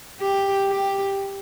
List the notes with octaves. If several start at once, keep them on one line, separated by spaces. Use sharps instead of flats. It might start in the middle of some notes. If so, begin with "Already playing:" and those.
G4
G4